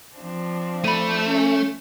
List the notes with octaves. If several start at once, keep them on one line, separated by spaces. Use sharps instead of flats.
F3 C4 D4
A3 B5 D#7
C#4